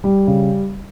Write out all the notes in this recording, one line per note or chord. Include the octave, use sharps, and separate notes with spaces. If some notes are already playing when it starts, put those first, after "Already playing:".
G3
C#3